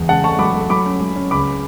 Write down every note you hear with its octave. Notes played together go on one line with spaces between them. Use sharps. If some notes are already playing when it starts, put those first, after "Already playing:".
Already playing: E2
C#3 F#5 A5
A3 A5 C#6
F#3 B5 D6
A3
F#3 B5 D6
C#4
F#3
C#4
C#2 B5 D6